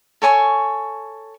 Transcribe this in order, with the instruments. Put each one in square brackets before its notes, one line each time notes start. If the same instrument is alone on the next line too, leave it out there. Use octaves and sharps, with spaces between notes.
[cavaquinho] A4 C#5 G#5 C#6